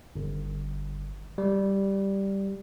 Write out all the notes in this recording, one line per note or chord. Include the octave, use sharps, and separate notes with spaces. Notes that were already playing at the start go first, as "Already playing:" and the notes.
G1
G3